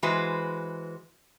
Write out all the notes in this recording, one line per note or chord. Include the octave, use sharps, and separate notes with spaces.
E3 G#3 F#4 B4 C5